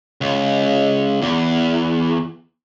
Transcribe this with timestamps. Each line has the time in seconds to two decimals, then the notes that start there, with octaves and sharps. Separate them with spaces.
0.21 C#2
1.22 E2